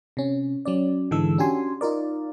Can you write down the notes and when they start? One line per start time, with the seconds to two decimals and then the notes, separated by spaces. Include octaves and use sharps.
0.17 C3 C#4
0.65 F#3 C#4 D5
1.11 G#2 D3 E3 G#3 A4 E6
1.38 C#4 D4 F#4 G4 G#5 C6
1.81 D#4 F4 A#4 D5